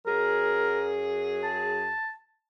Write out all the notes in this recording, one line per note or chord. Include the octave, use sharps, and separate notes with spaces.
F#2 F#3 G#4 A#4
A5